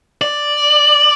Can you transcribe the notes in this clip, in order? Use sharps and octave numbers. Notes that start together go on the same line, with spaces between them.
D5